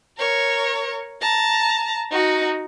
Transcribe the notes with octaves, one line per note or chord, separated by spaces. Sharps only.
A#4 C#5
A5 A#5
D#4 F#4